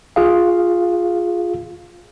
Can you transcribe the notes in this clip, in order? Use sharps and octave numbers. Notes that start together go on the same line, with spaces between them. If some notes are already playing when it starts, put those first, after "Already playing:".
F4 G#4 F5